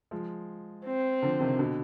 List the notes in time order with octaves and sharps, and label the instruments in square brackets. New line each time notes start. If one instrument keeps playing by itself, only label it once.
[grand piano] F3 G#3
[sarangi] C4
[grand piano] D3 F3
C3 D#3
B2 D3